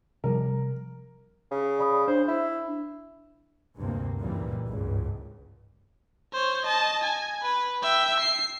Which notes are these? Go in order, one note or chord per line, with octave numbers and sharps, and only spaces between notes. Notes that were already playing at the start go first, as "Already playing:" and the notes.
C3 F3 G3 A#4
C#3
D5 B5 D#6
D4 C5
E4
F1 D2 G2 C3 A#3 C4
C#2 F#2 A#2 E3 G3 A#3
G#1 C#2 G2
C5 C#5
D#5 A5
G#5
B4
E5 G5
C7